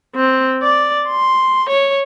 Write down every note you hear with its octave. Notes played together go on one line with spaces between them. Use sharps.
C4
D5
C6
C#5